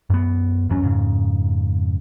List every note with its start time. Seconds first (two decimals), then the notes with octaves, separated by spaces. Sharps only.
0.10 F#2 B3
0.69 G1 E2 F#3 C#4
0.82 F2 G#2 C#3